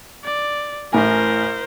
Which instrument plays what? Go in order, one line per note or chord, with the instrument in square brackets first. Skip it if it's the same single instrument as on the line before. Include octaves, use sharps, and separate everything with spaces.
[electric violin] D5
[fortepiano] A1 A2 G#5 [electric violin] A#4 C5